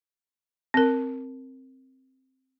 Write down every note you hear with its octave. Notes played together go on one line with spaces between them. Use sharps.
C4 A#4